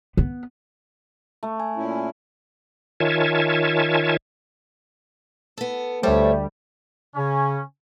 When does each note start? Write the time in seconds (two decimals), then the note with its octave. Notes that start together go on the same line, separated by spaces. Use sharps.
0.17 B3
1.43 A3
1.60 G#5
1.76 A#2 C#4 E4
3.00 D#3 F4 C#5 E5 G#5 A5
5.58 B3 A4
6.03 D2 G3 A3 C5 C#5 G5
7.15 C#3 C#4